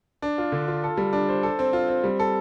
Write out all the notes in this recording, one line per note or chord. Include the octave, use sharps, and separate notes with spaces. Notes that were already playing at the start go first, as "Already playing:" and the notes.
D4
F4
D3
F4
A4
G3
D4
C5
A4
C4
F4
C4
G3
A4